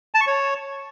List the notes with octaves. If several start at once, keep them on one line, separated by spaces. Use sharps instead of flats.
A5
C#6
C#5